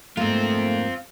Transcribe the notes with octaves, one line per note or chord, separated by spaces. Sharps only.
G#2 A3 A#3 C4 F4